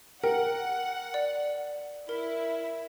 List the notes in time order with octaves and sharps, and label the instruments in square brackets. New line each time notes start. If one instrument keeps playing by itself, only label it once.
[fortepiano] A#4 [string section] F#5 [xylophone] G5
[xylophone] D5
[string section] E4 [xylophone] A#4